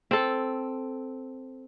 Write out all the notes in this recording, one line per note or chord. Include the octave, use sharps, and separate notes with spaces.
C4 A4